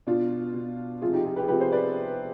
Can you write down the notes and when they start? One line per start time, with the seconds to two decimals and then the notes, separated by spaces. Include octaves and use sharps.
0.07 B2 D4 F4
0.54 B2
1.01 C3 F3 F4 G#4
1.13 D#4 G4
1.25 F4 G#4
1.36 G4 B4
1.43 G#4
1.48 C3 F3 G4 B4
1.60 G#4 C5
1.72 B4 D5